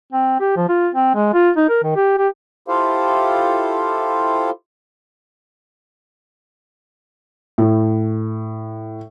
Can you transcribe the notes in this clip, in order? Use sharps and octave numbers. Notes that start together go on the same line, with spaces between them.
C4
G4
F3
F4
C4
G#3
F4
D#4
A#4
D#3
G4
G4
E4 F4 G4 A4 C5 F5
A2